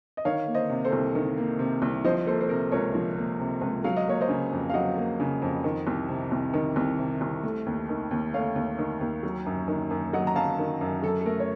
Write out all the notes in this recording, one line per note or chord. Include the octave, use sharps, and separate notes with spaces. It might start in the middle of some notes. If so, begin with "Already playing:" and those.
D#5
D#3 C#5 F5
A#3
C5 D#5
C3
A4 C5
C2
D#3
A#3
C3
C2
F3 C5 D#5
A#3 A4 C5
C5
C3 A#4
C#2 A#4 C#5
F3
A#3
C3
C#2
F#3 F5
D#5
A#3 C#5
C5 D#5
C#3
F2
F5
F#3 D#5 F#5
A#3
C#3
F2
D#3
C2
C3
C2
D#3
C2
C3
C2
A3
D#2
D#3
D#2
A3 C#5 F5
D#2
D#3
D#2
F#3
F#2
D#3
F#2
F#3 D#5 F#5
A#5
F#2 F5 A5
D#3
F#2
F#3 A4
A4
A3 A#4
C#5